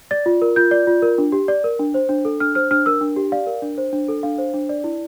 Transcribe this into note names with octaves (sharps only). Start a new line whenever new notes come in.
D5 A6
F4
A#4
F4 G6
D5
F4
A#4
D4
G4
D5
A#4
D4
C5
D4
A4
D4 F6
C5 F6
D4 F6
A#4 E6
D4
G4
D5 F5
A#4
D4
C5
D4
A4
D4 F5
C5
D4
D5
E4